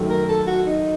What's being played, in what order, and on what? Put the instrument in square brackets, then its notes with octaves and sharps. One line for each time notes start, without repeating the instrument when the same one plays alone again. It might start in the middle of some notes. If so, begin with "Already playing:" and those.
Already playing: [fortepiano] F#2 D#3 A3
[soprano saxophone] A#4
A4
F#4
D#4